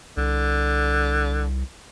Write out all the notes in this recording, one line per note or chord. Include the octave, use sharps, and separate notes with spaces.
C2 D3